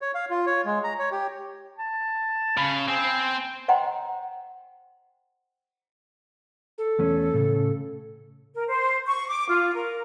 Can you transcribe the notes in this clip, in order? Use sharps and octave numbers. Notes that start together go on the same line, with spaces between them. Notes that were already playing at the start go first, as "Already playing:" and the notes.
C#5
F5
F4
C#5
G#3
A#5
C#5
G4
A5
C#3 B5
C4 G#5
C5 D#5 F#5 G5 A#5 C6
A4
E2 A3 C#4
A2 C#3
A#4
C5
C#6
D6
F4
A#4